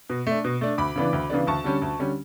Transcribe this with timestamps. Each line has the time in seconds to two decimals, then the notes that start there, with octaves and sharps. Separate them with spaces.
0.10 B2
0.27 A3 D4
0.44 B2
0.61 A3 D4
0.78 D2 B5 D6
0.96 C#3 E3 B3 D4
1.13 D2
1.30 C#3 E3 B3 D4
1.47 D2 A5 C#6
1.64 D3 G3 C#4
1.82 D2
1.99 D3 G3 C#4